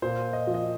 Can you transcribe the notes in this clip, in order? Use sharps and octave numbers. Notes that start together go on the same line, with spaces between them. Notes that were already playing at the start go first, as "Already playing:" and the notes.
A#2 C5
D#5
F3
D#5